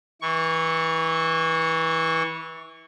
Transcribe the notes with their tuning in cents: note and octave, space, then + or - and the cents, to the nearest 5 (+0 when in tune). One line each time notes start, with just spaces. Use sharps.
E3 -20 C#6 +0